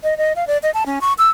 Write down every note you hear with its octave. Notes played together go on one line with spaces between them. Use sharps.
D#5
D#5
F5
D5
D#5
A5
C#4
C#6
E6